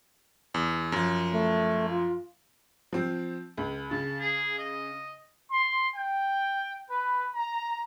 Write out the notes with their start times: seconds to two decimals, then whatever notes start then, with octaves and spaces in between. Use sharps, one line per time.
0.54 E2
0.92 F#2 F3
1.34 A3
1.90 F4
2.93 F3 C4
3.58 C#2
3.91 C#3 A5
4.20 G#4
4.59 D#5
5.50 C6
5.94 G5
6.90 B4
7.34 A#5